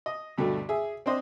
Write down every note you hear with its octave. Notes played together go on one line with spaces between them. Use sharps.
D#5
D2 G2 B2 A3
G#4 E5
C4 D4 C5 D#5